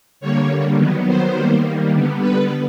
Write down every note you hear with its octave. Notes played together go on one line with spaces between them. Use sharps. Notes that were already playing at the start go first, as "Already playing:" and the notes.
D3 G3 A#3 C#5
D#3 F#3 B3
C5
D#3 G3 A#3
D3 G3 B3
B4